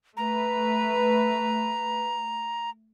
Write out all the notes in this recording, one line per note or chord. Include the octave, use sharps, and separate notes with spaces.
A3 B4 A#5